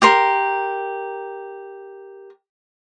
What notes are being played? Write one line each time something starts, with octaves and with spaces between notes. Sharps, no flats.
G4 A#4 C6